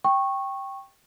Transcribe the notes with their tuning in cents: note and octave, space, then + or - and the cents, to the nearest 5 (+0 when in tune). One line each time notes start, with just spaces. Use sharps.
G5 +0 C#6 -15